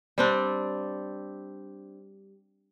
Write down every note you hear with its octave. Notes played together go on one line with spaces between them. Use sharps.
G3 C4 D4